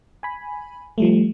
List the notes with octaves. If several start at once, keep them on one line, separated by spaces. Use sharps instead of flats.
G#5 B5
F3 G3 A3